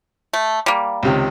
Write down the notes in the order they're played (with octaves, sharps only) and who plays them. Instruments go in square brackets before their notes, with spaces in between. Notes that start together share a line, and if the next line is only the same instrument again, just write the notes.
[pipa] A3
G3 A#3
[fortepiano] C#2 C3 D#3